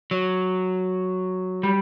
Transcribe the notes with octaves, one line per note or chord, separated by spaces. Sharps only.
F#3
G3